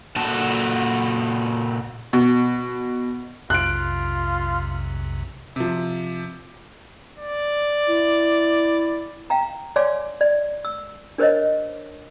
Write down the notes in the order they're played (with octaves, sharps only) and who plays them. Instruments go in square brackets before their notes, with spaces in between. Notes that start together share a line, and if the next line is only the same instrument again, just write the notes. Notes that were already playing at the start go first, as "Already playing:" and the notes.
[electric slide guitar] A#2 F#4 A4 A5
[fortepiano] B2
[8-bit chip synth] B1 F2 C3 [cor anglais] F4 [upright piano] F#6 D7
[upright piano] C3 F3
[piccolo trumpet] D5
[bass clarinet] E4
[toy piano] F5 G5 A#5
C#5 D5 F5 G#5 C6 D6
D5
E6
D4 A#4 C5 C#5 D#5